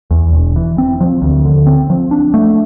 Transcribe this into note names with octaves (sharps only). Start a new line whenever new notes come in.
E2
E1
E3
C4
F3
D2
D3
C4
F3
D4
A3